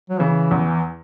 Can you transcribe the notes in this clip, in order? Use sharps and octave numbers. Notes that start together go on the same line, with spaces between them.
F#3
C#3 E3
E2